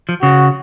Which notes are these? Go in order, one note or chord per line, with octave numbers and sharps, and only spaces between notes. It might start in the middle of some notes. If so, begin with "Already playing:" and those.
F3
C#3 F#4